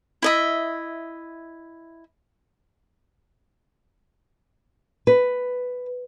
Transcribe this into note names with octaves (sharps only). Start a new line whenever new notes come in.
E4 D#5 E5
B4